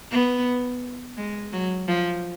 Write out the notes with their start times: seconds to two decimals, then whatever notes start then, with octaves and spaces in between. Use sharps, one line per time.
0.11 B3
1.17 G#3
1.52 F#3
1.88 F3